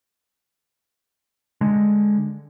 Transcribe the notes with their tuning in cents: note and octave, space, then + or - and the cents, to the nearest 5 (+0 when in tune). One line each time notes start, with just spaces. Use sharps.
D3 +0 G#3 +0